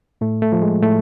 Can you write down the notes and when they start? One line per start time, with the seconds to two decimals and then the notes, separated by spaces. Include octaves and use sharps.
0.21 A2 A3
0.42 A3
0.52 F3
0.62 G#3
0.82 A2 A3